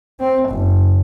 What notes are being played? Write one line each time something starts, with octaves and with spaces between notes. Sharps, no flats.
C4
F#1